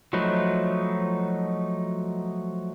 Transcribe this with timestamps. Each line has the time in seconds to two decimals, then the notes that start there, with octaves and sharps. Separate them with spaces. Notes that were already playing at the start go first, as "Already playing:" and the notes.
0.13 F3 F#3 A3 D#4 B4